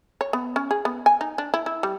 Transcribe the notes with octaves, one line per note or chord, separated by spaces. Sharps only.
C#5
B3
C#4
G#4
B3
G#5
D#4
D4
E4
E4
G3